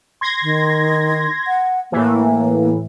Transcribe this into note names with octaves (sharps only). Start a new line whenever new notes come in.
C6 G#6 A#6
D#3
F#5
A2 E3 A#3